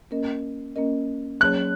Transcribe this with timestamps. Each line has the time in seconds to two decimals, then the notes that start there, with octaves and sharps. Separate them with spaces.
0.11 A#3 C#4 A#4 D#5
0.76 A#3 C#4 A#4 D#5
1.40 F#3 A#3 C#4 G#4 C#5 F#6